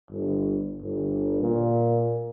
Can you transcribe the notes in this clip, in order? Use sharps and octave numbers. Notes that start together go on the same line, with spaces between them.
G1
G1
A#2